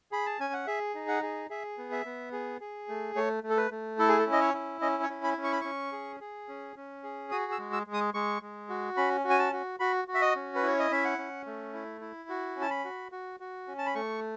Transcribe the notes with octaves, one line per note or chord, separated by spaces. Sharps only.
G#4 B5
A5
C#4 G#5
F#5
G#4 E5
D#4
F#5
G#4
G#4 E5
B3
E5
B3
G#4
G#4
A3
A3 C#5
A3
A4
B4
A3
E4 A4
G#4
A4
C#4
D#5
C#5
E4
C#4 D#5
C#5
E4
B5
C#4
C#6
B5
C#4 C#6
G#4
G#4
C#4
C#4
G#4
F#4 D#6
E6
G#3
E6
G#3
D#6
G#3 C#6
G#3
F#4
C#4 B5
F#4
G#5
A5
F#4
F#4 B5
F#4
E5
D#5
C#4
B4
E4 C#5
D#5
C#4 E5
F#5
C#4
A3
E4
E4
F#4
C#4
A5
B5
F#4
F#4
F#4
C#4
A5
B5
A3 C#6